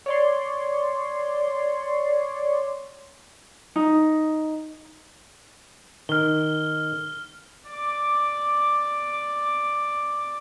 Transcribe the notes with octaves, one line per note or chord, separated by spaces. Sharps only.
C#5 D5 C6
D#4
D#3 F6 G7
D5 D6